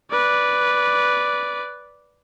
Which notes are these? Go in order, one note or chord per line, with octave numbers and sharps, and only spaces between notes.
B4 D5